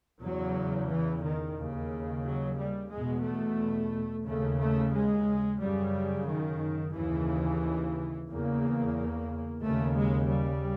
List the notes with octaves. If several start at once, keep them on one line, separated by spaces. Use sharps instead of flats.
E2 C#3 F#3
E3
D#3
D#2 C#3
F#3
G3
E2 B2 G#3
A3
D#2 C#3 A3
A3
G#3
F#2 C#3 G3
D#3
D#2 C#3 E3
E2 C#3 A#3
D#2 C#3 A3
G#3
G3